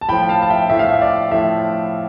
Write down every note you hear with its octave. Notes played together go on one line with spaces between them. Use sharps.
A5
A2 F3 G5 B5
F5 A5
A5
E5 G5
A2 F3 E5
F5
E5
D5
A2 F3 E5